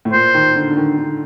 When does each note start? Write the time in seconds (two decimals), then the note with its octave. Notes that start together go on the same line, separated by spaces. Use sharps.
0.05 A2
0.13 A#2 C5
0.34 D#3
0.56 D3
0.71 D3
0.77 D#3
0.98 D3